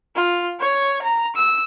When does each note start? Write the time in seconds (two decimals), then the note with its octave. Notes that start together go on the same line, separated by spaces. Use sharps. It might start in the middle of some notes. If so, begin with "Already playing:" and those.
0.16 F4
0.60 C#5
1.02 A#5
1.35 E6